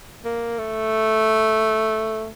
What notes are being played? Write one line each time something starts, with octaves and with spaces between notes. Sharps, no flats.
A#3
A3